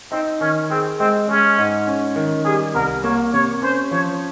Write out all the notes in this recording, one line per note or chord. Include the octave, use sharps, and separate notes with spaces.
C4 D#4
D#3 C#4
C4 G#4
G#3 C4
G#3 C#4
G#2
C#4
D#3
G3 G#4
C2 A#4
A#3 C#5
C3 C#5
C#4 C5
F3 C#5